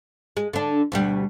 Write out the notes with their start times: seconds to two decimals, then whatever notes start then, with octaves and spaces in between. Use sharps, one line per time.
0.37 G#3
0.53 D3 D4
0.92 D2 B2 G3